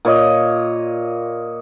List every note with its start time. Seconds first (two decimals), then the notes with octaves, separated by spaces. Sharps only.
0.05 A#2 C#5 D#5